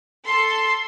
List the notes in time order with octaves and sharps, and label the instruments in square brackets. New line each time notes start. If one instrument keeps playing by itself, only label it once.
[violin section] A4 C6